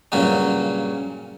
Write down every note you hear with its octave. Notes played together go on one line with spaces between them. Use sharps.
G2 A#2 C#3 F#3 C#4